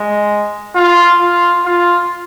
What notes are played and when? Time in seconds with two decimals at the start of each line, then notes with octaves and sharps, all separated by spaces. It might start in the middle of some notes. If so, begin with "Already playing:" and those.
Already playing: G#3
0.75 F4
1.20 F4
1.65 F4